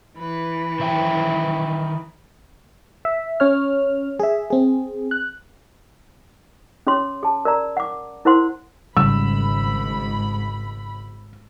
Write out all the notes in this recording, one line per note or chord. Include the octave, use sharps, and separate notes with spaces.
E3 B4
D#3 E5 G5
E5
C#4 C#5 F6
G#4 E5
C4 G#4
F#6
C#4 G#4 C#5 C6
G#4 A5
A#4 D5 A#5
F#5 D6
E4 A#4 C5 F#5 C6
G#1 G#2 C#3 G3 B5 E6